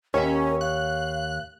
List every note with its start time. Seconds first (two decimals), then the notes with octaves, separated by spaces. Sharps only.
0.14 D#2 C#4 A#4 C#5 E5
0.61 F5 F#6